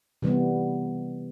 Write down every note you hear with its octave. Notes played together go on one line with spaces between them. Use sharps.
C3 E3 G3 B3